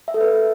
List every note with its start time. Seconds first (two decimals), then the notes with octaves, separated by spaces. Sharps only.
0.08 E5
0.14 A4
0.21 B4